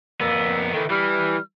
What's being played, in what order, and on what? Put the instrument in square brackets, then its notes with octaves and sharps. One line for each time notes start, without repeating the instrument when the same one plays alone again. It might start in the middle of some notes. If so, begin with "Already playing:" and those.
[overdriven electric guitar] F2 B3 [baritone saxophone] A#3 [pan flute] E6
[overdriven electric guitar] D#3 E3 [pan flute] A4
[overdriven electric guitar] E3 [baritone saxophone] G3 [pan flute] F6